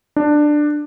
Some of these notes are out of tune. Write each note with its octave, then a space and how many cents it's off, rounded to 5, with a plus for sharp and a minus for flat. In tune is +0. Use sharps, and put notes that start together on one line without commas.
D4 +15